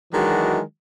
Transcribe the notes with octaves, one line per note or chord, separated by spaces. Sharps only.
D#3 E3 F#3 G#3 D4 F#4